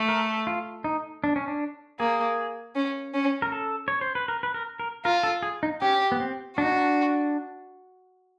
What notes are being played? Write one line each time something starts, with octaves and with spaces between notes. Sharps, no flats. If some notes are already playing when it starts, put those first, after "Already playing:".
Already playing: A3
A#4
F4
D#4
D4
C#4
D4
A#3 G#4
C#4
C#4
A#4
A4
C#5
C5
B4
A#4
B4
A#4
A#4
F4 A#4
A4
G#4
D#4
C#4 G4
B3
C4
D4 F#4
D#4
D4